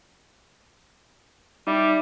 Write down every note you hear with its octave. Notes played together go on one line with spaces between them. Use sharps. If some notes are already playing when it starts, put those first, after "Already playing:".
G3 D#4 E5